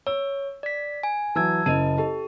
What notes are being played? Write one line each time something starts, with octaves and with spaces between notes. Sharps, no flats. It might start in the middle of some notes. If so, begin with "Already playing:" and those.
C#5 E6
D5 B6
G#5
E3 F#3 A5 E6 G#6
F#1 C#3 E4 D#5 A5 D#7
G4 A4